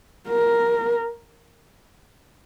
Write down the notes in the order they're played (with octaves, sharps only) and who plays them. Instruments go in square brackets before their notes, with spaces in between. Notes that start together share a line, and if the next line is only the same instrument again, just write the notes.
[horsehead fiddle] A#4